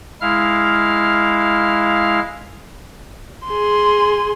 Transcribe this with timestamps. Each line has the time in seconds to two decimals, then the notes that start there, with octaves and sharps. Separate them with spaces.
0.21 G#3 E4 F5 F6
3.48 G#4 C6